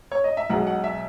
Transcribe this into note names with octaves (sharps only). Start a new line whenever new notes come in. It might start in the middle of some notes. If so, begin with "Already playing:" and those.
C#5
D#5
E5
B1 B2 G#3 F#5
F#5
E5